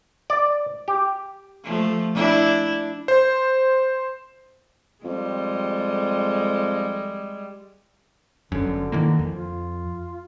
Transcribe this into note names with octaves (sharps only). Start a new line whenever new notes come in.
D5
G4
F3 A3
D4 E4
C5
F2 G3 G#3
G1 F#2 D3
D#3 E3 A#3
F2
F4